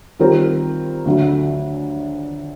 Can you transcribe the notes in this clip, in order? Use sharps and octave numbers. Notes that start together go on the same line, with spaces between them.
D#3 G3 C4 F4 A#4
D2 D3 F#3 A3